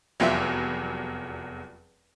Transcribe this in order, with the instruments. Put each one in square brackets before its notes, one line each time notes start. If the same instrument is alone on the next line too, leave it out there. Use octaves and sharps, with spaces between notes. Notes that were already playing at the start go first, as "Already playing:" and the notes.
[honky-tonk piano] F1 E2 F#3 [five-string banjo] G3 F4 E5